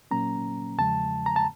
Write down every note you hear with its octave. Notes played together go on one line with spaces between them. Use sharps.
A#2 F#3 A#3 C#4 A#5
E2 C#3 F3 G#3 A5
A#5
A5